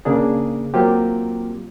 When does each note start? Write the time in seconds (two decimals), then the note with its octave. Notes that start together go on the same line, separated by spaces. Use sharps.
0.05 C#3 A#3 D4 G#4
0.74 F#3 A#3 C4 F4 G4